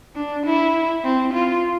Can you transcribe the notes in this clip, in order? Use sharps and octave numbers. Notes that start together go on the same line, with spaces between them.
D4
E4
C4
F4